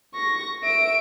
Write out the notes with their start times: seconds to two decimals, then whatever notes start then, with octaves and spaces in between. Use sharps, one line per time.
0.15 C#6 A#6
0.64 E5 D7